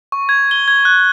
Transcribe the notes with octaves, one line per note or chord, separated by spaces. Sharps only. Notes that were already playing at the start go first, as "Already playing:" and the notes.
C#6
G#6
G7
G#6
F#6